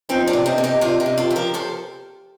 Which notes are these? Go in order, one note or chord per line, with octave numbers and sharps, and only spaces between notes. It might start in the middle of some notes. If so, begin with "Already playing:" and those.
F3 C4 D#4
D4 F4
C3
C4 D#4
C3 A4
D#4 G4
C3 D4 F4
D#4 G4
C3
F4 A4
F3
G4 A#4
F3 A4 C5